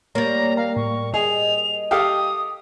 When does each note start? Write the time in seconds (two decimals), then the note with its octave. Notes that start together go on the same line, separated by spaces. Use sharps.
0.15 G3 A#3 C#5 A#5
0.57 F5 A#5
0.77 A2 C#6
1.14 G#4 D#5 F7
1.91 G4 A4 F5 D#6